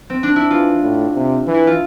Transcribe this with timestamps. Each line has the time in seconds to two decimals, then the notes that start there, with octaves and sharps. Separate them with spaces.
0.10 C4
0.23 D4
0.36 E4
0.50 E3 F4
0.82 A2
1.15 C3
1.47 E3
1.54 E4
1.67 F4